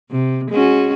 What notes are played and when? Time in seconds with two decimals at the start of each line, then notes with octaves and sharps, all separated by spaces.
0.11 C3
0.51 G#3 C#4 F#4